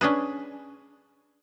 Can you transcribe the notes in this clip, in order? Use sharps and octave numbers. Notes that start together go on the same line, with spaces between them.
C#4 D4 G#4 B4